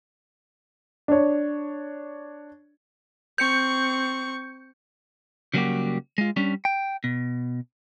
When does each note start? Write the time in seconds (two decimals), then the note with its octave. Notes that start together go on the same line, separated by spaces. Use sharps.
1.08 D4 C#5
3.38 C4 C#6 G6 C#7
5.54 C#3 F#3 G3 A#3 F#4 G4
6.18 G#3 F4
6.36 G3 C#4 D4
6.65 G5
7.04 B2